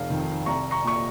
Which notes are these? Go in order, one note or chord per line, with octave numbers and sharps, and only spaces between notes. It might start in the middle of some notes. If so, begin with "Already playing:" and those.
Already playing: F1 F5
F2 D#3
C2 A#5 C#6
A#5 C#6
A#2 C#6